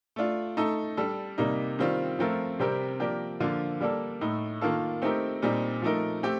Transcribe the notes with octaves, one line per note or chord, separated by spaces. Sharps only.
A3 D4 F4
A3 D#4 A4
G3 D4 A4
C3 G3 A#3 D#4
D#3 G3 C4 F4
F3 A3 C4 F4 A#4
C3 G3 C4 G4 A#4
F3 A#3 D4 G4 A#4
D3 F3 A#3 F4
G3 A#3 D4 A4
A2 A3 D#4
D#3 A#3 F4 A4
A3 C4 D#4 G4 A#4
A#2 G3 C4 D#4
F3 A3 D#4 A#4
A3 C4 G4